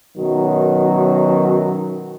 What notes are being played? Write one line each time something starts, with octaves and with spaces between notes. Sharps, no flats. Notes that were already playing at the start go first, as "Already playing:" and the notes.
F#2 B2 D#3 F#3